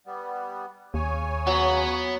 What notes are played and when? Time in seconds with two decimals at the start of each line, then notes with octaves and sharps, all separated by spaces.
0.06 G3 B3
0.94 D#2 C#3 C#5 G#5
1.47 F#3 B3